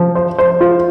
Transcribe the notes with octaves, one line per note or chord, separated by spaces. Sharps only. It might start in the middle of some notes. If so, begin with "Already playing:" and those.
Already playing: F3
C5
C5
F4